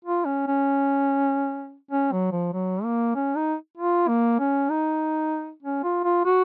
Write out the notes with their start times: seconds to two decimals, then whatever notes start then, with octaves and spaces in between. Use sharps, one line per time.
0.05 F4
0.25 C#4
0.47 C#4
1.91 C#4
2.12 F#3
2.32 F3
2.53 F#3
2.84 A#3
3.15 C#4
3.36 D#4
3.78 F4
4.08 A#3
4.39 C#4
4.69 D#4
5.63 C#4
5.84 F4
6.04 F4
6.25 F#4